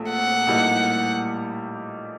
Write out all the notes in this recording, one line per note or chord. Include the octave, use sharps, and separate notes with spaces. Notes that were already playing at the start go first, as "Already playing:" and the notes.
Already playing: A#1 A#2 A3
F#5
A#1 A2 G3 A#3 D#4